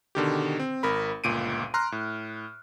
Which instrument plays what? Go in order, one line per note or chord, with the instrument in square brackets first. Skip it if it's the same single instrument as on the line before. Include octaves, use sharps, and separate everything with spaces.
[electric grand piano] B2 D3 D#3 G4
C4
G#1 A#4 B5
G1 C#2 A#2 D7 D#7
A#5 C6 F6 F#6
A2